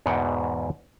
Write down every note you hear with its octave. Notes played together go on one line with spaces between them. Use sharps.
E2 G#2 B2 F#5 G5